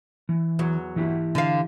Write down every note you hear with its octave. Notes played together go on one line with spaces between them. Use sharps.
E3
E2 F#3
E3 E4 G4
D3 F5